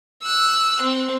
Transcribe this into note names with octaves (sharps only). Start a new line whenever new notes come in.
E6 F#6
C4